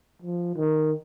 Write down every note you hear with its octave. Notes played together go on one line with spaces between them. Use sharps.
F3
D#3